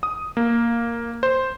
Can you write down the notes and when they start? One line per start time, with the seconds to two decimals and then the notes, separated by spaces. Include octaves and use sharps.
0.03 D#6
0.37 A#3
1.23 C5